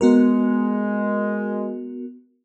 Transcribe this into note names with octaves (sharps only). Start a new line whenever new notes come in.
G#3 B3 F#4 A#4